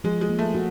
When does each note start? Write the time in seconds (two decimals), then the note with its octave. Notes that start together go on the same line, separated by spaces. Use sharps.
0.04 F3 G#3
0.21 G#3
0.29 A#3
0.39 A3
0.55 F#4